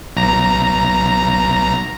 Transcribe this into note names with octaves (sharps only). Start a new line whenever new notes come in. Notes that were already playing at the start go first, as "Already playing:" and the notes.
B1 A#5